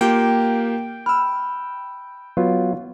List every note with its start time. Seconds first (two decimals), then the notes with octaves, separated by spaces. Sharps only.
0.01 A#3 F4 G4 G5
1.06 B5 E6 F6
2.37 F#3 B3 F4